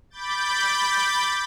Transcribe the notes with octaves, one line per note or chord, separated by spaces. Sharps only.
B5 D6 G6 A6